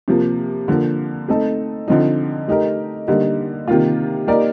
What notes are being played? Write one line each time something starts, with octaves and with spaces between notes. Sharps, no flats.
C3 F3 A#3
D3 F3 A#3
A3 C4 D#4 A4
D3 F3 C4 D#4
A3 D#4 G4 A#4
D3 G3 A#3 D#4
C3 D#3 A#3 F4
A#3 D#4 G4 A#4 D5